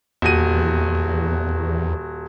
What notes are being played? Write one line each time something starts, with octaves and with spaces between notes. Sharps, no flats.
D#1 E2 F#4 D#7